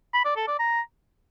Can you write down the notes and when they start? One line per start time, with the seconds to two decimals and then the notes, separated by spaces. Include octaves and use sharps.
0.14 B5
0.25 D5
0.37 A4
0.48 D5
0.59 A#5